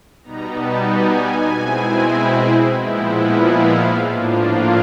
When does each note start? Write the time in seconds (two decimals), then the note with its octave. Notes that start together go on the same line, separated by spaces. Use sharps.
0.23 B2 G3 B3 D#4 A#5
0.55 A5
0.87 G#5
1.51 B2 G#3 C4 E4
2.77 A#2 F3 G#3 B3 E4 G5
3.10 F#5
3.41 F5
4.04 A2 F3 A#3 D4 F4